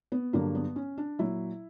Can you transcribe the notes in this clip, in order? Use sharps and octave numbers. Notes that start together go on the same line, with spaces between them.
B3
G2 D3 F#3 A#3
B3
C#4
D4
A#2 F#3 E4